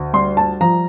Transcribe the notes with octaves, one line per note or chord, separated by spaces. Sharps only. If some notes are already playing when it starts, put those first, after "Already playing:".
Already playing: D2
G3 C6
A5
F3 A#5